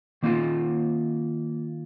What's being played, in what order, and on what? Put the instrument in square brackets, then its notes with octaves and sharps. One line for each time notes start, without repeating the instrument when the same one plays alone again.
[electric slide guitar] D#3 A#3 F4